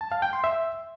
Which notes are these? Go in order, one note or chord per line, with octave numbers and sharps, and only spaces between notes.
A5
F5
G5
C6
E5